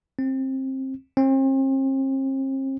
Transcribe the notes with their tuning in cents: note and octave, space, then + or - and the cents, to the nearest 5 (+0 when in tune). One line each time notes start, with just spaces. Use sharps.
C4 +20
C4 +40